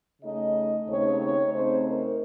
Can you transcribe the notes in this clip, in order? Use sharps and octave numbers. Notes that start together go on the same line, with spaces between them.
C#3 A3 D#4 D#5
D#2 C#3 A3 C4 D#4 C#5
C#5
C#3 A3 C4 D#4 C5
A#4